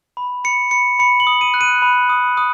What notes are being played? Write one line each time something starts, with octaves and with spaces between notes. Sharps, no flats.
B5
B5 C#7
B5 C#7
B5 C#7
F#7
D#6
D#7
F#6
D#7
B5
D#6
D#6